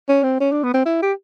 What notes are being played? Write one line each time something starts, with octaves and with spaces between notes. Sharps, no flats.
C#4
C4
C#4
D4
B3
C4
E4
G4